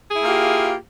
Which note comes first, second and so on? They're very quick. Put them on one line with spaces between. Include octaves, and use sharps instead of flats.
G#4 E4 A#3 F4 G4